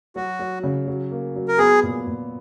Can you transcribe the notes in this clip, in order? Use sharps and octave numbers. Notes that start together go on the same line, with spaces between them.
F#3 F#4
F#3
C#3
F#3
A#3
F#3
A#4
B3 G#4
A#2
A#2